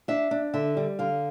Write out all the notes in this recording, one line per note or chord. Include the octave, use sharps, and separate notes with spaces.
D4 E5
D4
D3 E5
G3
D3 F5